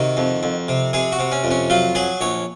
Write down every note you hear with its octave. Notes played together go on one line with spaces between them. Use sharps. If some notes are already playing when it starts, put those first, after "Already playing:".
Already playing: C3 D#3 F#4
F2
F2
C3
C3 G#4
F#4
C3
C#4
F2
C#4
F#3 F4
F#3 G#4
A#1 C#5